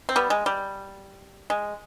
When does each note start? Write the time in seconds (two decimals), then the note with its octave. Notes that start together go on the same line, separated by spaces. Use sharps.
0.09 C4
0.16 G3 B3
0.30 G#3
0.46 G3
1.50 G#3